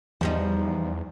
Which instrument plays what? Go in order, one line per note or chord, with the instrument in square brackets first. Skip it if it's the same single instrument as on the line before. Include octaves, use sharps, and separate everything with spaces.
[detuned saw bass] E2 [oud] F3 G3 D#4